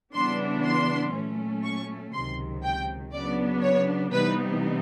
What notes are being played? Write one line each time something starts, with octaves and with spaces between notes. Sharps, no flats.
C#3 E3 G3 B3 D4 C6
C6
A#2 F#3 A3 C#4
C#6
C#2 C3 D#3 F#3 C6
G5
C#3 F#3 B3 D4 D5
C#5
C3 E3 G3 B3 D#4 B4